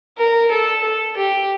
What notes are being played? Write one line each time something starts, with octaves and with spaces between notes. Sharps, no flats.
A#4
A4
A4
G4